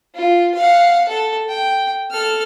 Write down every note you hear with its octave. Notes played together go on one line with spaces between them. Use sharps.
F4
F5 F#5
A4
G5
A4 F6